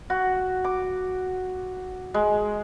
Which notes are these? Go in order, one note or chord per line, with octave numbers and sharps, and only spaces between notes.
F#4
D6
G#3